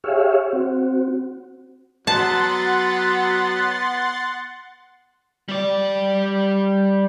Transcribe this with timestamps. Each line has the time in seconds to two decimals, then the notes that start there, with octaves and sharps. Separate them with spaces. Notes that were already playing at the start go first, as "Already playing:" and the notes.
0.04 G4 G#4 C#5 E5 F5
0.53 C4 F#4
2.07 F#3 B3 F#5 A5 C6 A6
5.49 G3 D5